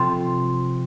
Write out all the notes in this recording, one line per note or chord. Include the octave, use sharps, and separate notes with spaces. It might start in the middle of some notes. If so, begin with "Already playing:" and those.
Already playing: C3 F3 C4 F4 A4